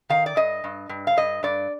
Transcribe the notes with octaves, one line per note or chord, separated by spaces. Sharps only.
D#3 F5
D5
G2 D#5
G2
G2
F5
G2 D#5
G2 D5